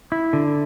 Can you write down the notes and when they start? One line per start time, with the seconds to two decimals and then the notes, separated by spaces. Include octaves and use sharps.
0.12 E4
0.33 D3